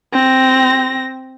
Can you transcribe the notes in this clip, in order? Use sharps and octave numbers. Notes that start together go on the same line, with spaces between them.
C4 A#6